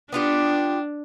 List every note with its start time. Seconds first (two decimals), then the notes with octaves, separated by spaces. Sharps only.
0.12 B3 D4 F4 G4